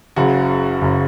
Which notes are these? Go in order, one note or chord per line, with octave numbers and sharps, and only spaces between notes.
F#1 F#2 C#3 F#4
F#1 F#2 C#3